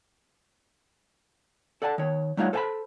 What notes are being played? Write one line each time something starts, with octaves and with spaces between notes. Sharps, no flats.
A4 D5 F#5 G#5 A5
D#3 C#5
G3 A3 D#4 F4 C#5 F#5
A4 C5 F5 G#5 A5 B5